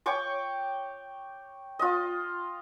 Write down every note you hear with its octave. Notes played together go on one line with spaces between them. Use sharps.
C#5 G5 C#6 D6
F4 D#5